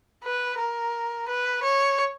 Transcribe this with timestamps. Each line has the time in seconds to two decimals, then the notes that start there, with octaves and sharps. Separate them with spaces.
0.24 B4
0.59 A#4
1.29 B4
1.63 C#5